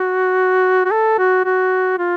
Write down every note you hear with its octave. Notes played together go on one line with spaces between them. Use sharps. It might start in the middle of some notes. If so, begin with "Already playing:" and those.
Already playing: F#4
F#4
A4
F#4
F#4
F4